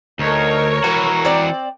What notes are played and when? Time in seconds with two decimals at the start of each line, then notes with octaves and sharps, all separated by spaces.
0.19 D2 D#4 A#4 C#5
0.84 E3 F#4 B4 A#5
1.25 C4 D5